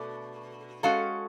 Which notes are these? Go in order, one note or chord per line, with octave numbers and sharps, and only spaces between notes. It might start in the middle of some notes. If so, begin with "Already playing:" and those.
Already playing: B2 A3 D4
G#3 C#4 F#4 A4 F5